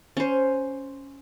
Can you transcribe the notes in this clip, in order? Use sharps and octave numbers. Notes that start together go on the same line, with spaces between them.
C#4 C5